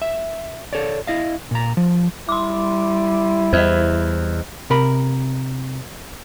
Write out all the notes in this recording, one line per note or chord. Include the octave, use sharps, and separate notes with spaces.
E5
A4 C#5 D5
E4 D#5 F5
A#2 A#5
F3
G3 E4 C6 D6
E2 C5 D#5
C3 A#4 B5